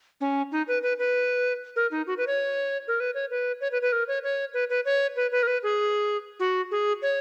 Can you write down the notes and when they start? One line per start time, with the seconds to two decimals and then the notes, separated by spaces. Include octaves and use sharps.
0.21 C#4
0.52 D#4
0.68 B4
0.83 B4
0.99 B4
1.76 A#4
1.91 D#4
2.07 F#4
2.18 B4
2.27 C#5
2.88 A#4
3.00 B4
3.15 C#5
3.31 B4
3.61 C#5
3.72 B4
3.82 B4
3.92 A#4
4.08 C#5
4.24 C#5
4.54 B4
4.70 B4
4.85 C#5
5.16 B4
5.32 B4
5.43 A#4
5.47 B4
5.63 G#4
6.40 F#4
6.71 G#4
7.02 C#5